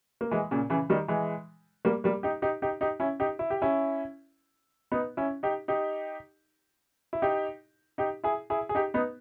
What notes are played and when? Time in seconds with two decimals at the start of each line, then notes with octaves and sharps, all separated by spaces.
0.21 A#3
0.31 E3 G#3
0.51 A#2 C#3
0.70 C#3 E3
0.90 D#3 G3
1.08 E3 G#3
1.85 G3 A#3
2.04 G3 A#3
2.23 D#4 G4
2.42 D#4 G4
2.62 D#4 G4
2.81 D#4 G4
3.00 C#4 E4
3.20 D#4 G4
3.39 E4
3.50 G4
3.62 C#4 E4
4.91 B3 D#4
5.17 C#4 E4
5.43 D#4 G4
5.68 D#4 G4
7.13 E4
7.22 D#4 G4
7.98 D#4 G4
8.24 E4 G#4
8.50 E4 G#4
8.69 G#4
8.75 D#4 G4
8.94 B3 D#4